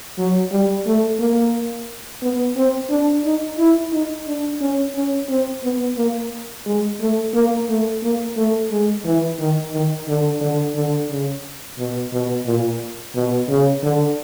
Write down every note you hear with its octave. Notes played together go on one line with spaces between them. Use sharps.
F#3
G3
A3
A#3
B3
C4
D4
D#4
E4
D#4
D4
C#4
C#4
C4
B3
A#3
G#3
A3
A#3
A3
A#3
A3
G#3
E3
D#3
D#3
D3
D3
D3
C#3
B2
B2
A#2
B2
C#3
D3